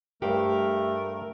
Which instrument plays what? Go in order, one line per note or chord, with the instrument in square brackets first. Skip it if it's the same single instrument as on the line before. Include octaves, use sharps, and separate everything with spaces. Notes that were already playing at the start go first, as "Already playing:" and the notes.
[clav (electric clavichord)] G2 C5 F#5 [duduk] A3 [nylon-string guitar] G4 [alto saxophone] A#4